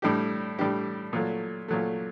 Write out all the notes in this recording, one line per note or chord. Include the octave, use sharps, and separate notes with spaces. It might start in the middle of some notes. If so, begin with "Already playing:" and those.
A2 G3 D4 G4
A2 G3 D4 G4
A#2 F#3 A3
A#2 F#3 A3